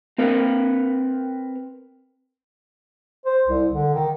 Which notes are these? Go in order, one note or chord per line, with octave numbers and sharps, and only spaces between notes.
C4 A#4 B4
C5
C2
D3
D#3